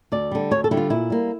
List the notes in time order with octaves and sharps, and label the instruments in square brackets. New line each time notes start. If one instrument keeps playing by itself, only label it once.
[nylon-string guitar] D2 D5
D3 G3
D2 C#5
A4
D3 G3 E4
F4
A#2 E4
G3 A#3